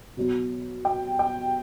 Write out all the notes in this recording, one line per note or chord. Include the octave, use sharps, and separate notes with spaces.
B2 F#3 B3
G5
G5